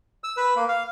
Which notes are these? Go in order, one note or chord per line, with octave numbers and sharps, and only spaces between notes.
E6
B4
A#3
F5